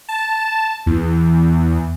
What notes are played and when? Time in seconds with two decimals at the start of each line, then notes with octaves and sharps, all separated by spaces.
0.09 A5
0.86 E2